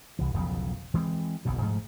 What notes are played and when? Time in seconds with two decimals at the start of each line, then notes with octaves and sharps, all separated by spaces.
0.19 C2 E3
0.34 E1 B1 C#3 F3
0.94 E3 G#3 A3 C4
1.45 F#1 B1 E2 B2
1.62 G#2 F3 A3